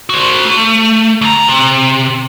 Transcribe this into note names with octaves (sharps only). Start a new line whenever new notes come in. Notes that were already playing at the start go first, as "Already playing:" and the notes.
F#4 C5
A3
D2 A#5
C3